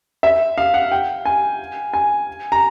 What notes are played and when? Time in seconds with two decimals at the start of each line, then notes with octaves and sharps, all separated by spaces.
0.23 E5
0.58 F5
0.74 F#5
0.92 G5
1.25 G#5
1.94 G#5
2.52 A#5